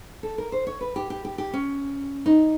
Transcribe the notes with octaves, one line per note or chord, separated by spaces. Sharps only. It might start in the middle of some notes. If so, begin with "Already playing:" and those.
A4
A#4
C5
C#5
B4
G4
G4
G4
G4
C#4
D#4